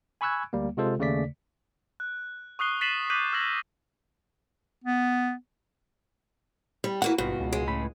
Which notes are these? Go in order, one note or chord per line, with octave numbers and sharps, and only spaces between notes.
G#5 B5 C#6 E6 F#6 G#6
D2 G3 A#3
C3 G#3 F4 A4 C5
D#2 C#3 A3 D5 B6
F#6
C#6 D#6 F#6 C7 G7
A6 B6 C7 D#7 E7 F#7
D6 F#6 G6 B6 D#7 F#7
E6 F6 G#6 A#6 F#7
B3
G3
E3 A#3 F#4 F#5
G#1 G2 B2 F4 F#4
C#2
G#3
A2 B5